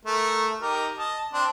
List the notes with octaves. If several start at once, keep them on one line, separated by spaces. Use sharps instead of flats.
A3 A#4
D#4 G4 A#4
D#5 A5
C4 D4 C5